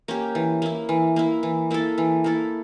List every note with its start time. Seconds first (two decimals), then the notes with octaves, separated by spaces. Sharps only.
0.08 A#3 C#4 G4
0.35 E3
0.62 A#3 E4
0.89 E3
1.16 A#3 E4
1.43 E3
1.71 A#3 E4 A4
1.98 E3
2.24 A#3 E4 A4